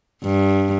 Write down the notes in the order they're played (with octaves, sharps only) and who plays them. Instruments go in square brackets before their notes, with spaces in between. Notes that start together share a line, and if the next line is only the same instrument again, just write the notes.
[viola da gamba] G2